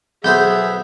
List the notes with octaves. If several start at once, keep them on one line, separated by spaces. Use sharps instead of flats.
B1 B3 G#4 C5 E5 G6